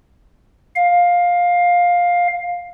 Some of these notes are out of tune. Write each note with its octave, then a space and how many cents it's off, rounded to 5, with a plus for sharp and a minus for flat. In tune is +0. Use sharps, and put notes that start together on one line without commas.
F5 +15